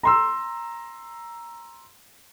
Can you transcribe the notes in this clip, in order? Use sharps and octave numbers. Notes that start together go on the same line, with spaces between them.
A#5 C6 E6